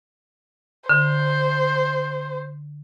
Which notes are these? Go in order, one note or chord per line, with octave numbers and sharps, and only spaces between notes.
D3 C5